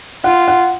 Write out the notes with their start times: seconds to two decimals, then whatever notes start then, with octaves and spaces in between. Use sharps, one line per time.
0.24 F4 F#5
0.48 F#5